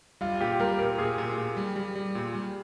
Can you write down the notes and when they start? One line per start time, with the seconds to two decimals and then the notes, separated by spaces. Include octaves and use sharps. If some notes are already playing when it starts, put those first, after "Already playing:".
0.21 G3 F4
0.41 A#2 G4
0.60 G3 A#4
0.79 A#2 A#4
0.98 A#2 G#4
1.18 A#2
1.38 A#2
1.57 G3
1.76 G3
1.95 G3
2.15 A#2
2.34 G3